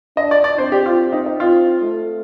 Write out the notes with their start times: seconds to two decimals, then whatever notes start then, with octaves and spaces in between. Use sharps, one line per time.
0.17 D4 D#5
0.31 D5
0.44 D5
0.58 C4 C5
0.72 G4
0.86 F4
1.12 D#4
1.26 D#4
1.40 C4 F4
1.81 A3